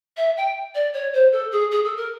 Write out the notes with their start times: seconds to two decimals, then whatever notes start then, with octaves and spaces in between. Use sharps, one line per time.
0.17 E5
0.37 G5
0.75 D5
0.94 C#5
1.13 C5
1.32 A4
1.52 G#4
1.71 G#4
1.85 A4
1.97 A#4